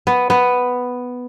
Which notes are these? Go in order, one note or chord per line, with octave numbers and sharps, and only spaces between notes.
B3
B3